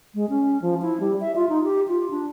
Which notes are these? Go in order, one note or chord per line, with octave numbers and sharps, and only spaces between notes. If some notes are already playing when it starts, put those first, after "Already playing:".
G#3
C#4
F3
E4
G3
E5
F4
D#4
G4
F4
D4